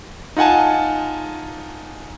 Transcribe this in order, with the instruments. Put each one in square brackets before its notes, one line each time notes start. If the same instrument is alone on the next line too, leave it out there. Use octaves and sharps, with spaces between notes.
[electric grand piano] D#4 F4 F#5 G#5 A5